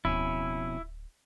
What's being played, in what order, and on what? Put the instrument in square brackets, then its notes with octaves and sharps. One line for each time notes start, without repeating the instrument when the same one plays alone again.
[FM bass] D1 [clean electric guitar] F2 B2 C#4 [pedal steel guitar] E4